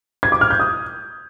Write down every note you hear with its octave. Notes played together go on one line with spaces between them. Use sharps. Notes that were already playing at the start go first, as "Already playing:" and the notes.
G#6
D6
F6
G6
D#6